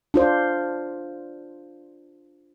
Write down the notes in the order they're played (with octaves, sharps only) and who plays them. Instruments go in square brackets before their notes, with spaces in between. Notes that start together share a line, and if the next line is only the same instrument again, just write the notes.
[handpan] D4 F4 C5